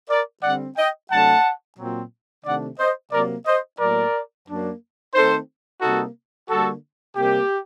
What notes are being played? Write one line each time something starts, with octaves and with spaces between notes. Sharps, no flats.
A#4 D5
D3 G3 C4 D5 F#5
D#5 G5
C3 F#3 A3 D4 F#5 A5
A#2 F#3 C4
C3 D#3 A3 D4 D5 F#5
C5 D#5
C3 F#3 A#3 A#4 D5
C5 D#5
A2 F#3 A#3 A#4 D5
F#2 F#3 A#3 D4
D#3 A3 C4 D#4 A4 C5
C3 G3 A#3 D#4 F#4 A4
D3 G3 A#3 F#4 A4
C3 G3 A#3 G4